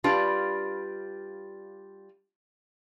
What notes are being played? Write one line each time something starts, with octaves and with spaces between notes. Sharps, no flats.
G3 D4 F4 B4 F5